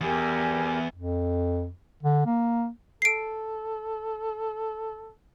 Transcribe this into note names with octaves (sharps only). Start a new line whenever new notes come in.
E2 G4 A#4 G#5
F2
D3
A#3
A4 C7 D7